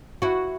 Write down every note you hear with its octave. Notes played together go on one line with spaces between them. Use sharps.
E4 F#4